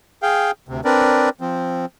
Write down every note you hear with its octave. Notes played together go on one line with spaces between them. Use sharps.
G#4 F5 G5
D2 C3
C4 D4 A#4 B4 D5
F3 C4